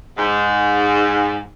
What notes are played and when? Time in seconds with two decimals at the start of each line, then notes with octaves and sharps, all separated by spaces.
0.17 G#2